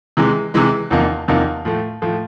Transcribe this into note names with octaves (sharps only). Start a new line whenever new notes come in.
C3 E3 G#3
C3 E3 G#3
E2 C3 F3 A#3 D#4
E2 C3 F3 A#3 D#4
A2 F3 A3
A2 F3 A3